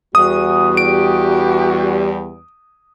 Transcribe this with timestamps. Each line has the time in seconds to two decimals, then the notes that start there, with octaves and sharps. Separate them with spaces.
0.15 E2 G3 F#4 D#6
0.77 G4 D7